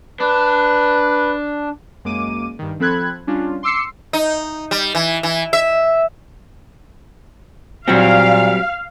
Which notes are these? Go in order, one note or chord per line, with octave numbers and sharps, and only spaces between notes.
D4 B4
F#2 G#3 A#3 D6 D#7
G2 D#3
F3 C4 A4 B5 F#6 G#6
G3 C#4 D4 F4
C6 D6 E6 C7 C#7
D#4
G3
E3
E3
E5
A#2 F#3 G3 C4 F5